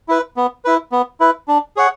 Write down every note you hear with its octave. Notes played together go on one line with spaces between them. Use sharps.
E4 B4
B3
E4 B4
B3
E4 B4
D4
G#4 C#5 F#5